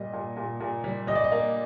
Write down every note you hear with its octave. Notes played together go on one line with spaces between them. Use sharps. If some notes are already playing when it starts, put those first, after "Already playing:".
Already playing: A#2 G3 D#5
A#2
A#2
A#2
G3
G3 D#5
D5
D#5
A#3